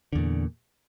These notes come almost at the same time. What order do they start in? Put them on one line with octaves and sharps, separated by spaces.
D3 E2 A#2